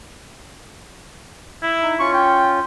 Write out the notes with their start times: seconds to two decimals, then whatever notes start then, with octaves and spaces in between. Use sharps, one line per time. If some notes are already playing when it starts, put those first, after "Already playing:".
1.63 E4
1.82 D#4
1.99 C#4 F4 C#6
2.14 G5